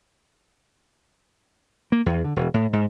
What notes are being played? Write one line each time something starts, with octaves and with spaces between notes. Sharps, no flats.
A#3
E2
D3
E1
A2
G#2